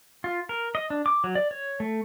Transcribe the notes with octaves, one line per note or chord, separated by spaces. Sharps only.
F4
A#4
D#5
D4
D6
F#3
D5
C#5
A3